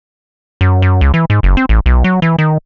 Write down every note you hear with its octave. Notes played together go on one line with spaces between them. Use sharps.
F#2
F#2
C#2
E3
G#2
F#1
C4
A1
B1
F#3
E3
D#3